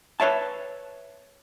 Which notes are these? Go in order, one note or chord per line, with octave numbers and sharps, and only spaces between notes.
B4 C#5 E5 A5